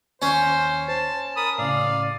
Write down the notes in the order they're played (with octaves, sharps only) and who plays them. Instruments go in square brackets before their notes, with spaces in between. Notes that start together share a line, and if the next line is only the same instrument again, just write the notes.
[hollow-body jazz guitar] D#2 [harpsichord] C#4 [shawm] C5
[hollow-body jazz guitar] C5 [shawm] A5
[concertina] A#4 B5 [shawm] D#6
[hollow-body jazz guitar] A2 C#3 [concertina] D5 [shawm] F5